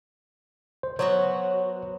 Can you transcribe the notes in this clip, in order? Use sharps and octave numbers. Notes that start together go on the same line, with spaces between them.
C5
F#3 B3 F#4 C5 C#5